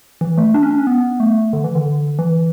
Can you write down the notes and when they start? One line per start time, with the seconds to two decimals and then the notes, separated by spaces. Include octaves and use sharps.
0.21 E3
0.38 A3
0.54 D4
0.63 C#4
0.71 D4
0.79 C#4
0.87 B3
1.20 A3
1.53 D3
1.64 E3
1.75 D3
1.86 D3
2.19 E3